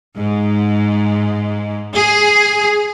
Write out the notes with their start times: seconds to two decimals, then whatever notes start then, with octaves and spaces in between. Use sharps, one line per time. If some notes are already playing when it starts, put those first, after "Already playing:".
0.16 G#2
1.94 G#4